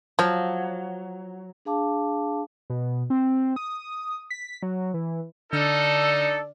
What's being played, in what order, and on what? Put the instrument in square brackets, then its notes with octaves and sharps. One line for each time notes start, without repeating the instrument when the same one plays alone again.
[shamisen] F3 [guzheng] F#3
[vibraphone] D4 G#4 F5 A5 D6
[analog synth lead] B2
C4
D#6
B6
F#3
E3
[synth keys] D3 F6 [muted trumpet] D#4 [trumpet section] A4 [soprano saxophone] D5